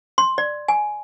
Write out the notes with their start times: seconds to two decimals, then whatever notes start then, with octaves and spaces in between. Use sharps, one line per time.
0.18 C6
0.38 D5
0.68 G#5